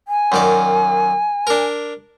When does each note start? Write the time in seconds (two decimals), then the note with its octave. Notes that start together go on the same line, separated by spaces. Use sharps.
0.08 G#5
0.32 F#2 D#3 D5
1.47 D4 A#4